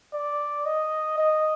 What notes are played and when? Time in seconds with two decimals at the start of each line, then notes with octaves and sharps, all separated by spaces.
0.13 D5
0.66 D#5
1.18 D#5